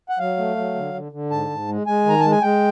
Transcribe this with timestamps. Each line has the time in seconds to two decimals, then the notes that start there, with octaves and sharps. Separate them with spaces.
0.09 F#5
0.19 F#3 F5
0.37 A3
0.57 F#3
0.75 D3
0.94 D3
1.12 D3
1.30 G#2 A5
1.50 G#2
1.68 G#3
1.87 G#3 G#5
2.06 D#3 A#5
2.20 G#3 A5
2.31 G#5
2.42 G#3 G5